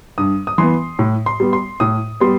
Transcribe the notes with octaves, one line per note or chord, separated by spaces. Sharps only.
G2 D#6
D#6
E3 B3 C6
A2
C6
G3 B3
C6
A2 D#6
G3 B3 C6